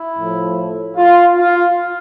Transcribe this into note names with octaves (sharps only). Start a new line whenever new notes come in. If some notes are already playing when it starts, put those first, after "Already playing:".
Already playing: E4
A2 F3 A3
F4
F4